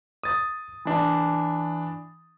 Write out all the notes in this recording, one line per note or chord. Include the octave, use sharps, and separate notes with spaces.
D#6 A6
E3 D4